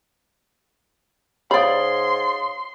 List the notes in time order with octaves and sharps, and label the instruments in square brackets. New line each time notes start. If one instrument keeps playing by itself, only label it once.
[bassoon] G#2 [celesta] C#5 F5 D#6 [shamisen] D5 B5 [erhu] C6